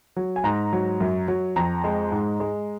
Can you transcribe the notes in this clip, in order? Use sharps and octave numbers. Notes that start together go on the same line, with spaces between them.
F#3
G#5
G#2 A#5
F#3
F#2
F#3
F2 A#5
G#3
G#2
G#3